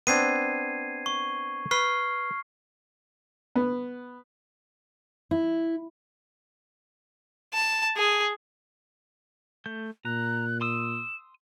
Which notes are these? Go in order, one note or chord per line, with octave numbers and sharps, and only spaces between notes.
B3 C4 D4 G#6 C7 D#7
C#6
B4 C#6 F6 C7
B3
E4
A5
G#4
A3 G6
A#2 A#5 F#6
C6 D#6 E6 E7